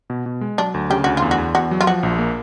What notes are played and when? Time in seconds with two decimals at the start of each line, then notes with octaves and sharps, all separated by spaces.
0.10 B2
0.26 B2
0.41 G#3
0.58 F#3 D4
0.74 D2
0.90 C#3 G4
1.04 D2 F#4
1.17 E2 F4
1.31 F#4
1.38 E2
1.54 E2 F#4
1.71 F#3
1.81 F4
1.87 F3 F#4
2.03 A#1
2.19 A#3